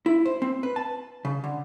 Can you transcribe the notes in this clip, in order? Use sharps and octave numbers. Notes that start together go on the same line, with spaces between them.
E4
C5
C4
B4
A5
C#3
D3